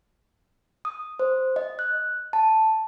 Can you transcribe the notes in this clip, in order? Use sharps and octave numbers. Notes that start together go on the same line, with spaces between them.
D#6
C5
D#5
F#6
A5